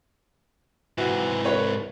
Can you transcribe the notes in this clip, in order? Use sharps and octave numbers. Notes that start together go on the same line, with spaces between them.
G#2 C3 E3 F#4
C2 B4 C#5